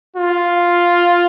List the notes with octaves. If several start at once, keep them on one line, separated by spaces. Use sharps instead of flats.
F4